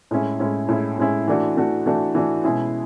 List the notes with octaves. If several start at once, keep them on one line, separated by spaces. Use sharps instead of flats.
A2 G#3 C#4 E4
A2 G#3 C#4 E4
A2 G#3 C#4 E4
A2 G#3 C#4 E4
E3 A3 D4 F#4
E3 A3 D4 F#4
E3 A3 D4 F#4
E3 A3 D4 F#4
B2 G#3 C#4 E4 G#4